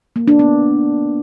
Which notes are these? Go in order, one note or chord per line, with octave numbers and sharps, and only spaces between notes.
A#3
D4
B3